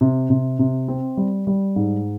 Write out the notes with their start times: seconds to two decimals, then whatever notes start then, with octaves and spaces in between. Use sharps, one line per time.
0.01 C3
0.30 C3
0.59 C3
0.88 C4
1.17 G3
1.47 G3
1.76 G#2